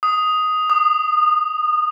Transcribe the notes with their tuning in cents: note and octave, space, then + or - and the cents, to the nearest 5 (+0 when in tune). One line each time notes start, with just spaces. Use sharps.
D#6 +5
D#6 -25